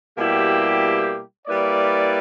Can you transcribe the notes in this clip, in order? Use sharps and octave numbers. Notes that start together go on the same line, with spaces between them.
B2 G3 A#3 E4 G4
G3 A#3 E4 B4 D5